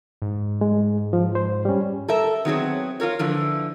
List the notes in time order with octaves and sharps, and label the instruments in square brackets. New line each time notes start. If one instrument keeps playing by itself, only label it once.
[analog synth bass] G#2
[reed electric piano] G#3
F3
C5
G3 C#4
[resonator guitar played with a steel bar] A4 A#4 E5
D#3 F#3 B3 C4 G#4 C#5
F4 G#4 A#4 C#5
D3 E3 F3